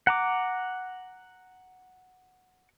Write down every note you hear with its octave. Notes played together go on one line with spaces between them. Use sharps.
F#5 A#5 D6